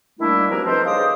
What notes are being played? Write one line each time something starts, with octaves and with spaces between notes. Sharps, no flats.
D#3 G3 A3 A#3 D4 E4
B2 F3 C4 D4 G4 A#4
D#4 A4 B4 C5
C#3 C5 D#5 F5 D6 D#6